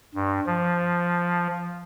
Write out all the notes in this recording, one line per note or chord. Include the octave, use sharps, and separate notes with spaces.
G2
F3